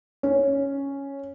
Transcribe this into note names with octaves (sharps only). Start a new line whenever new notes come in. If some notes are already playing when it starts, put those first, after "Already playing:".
C#4